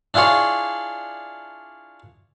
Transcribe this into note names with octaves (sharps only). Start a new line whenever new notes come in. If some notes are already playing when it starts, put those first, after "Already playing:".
D4 E4 F4 G#4 C#5